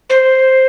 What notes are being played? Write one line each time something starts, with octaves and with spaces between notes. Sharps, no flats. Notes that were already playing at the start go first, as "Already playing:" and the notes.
C5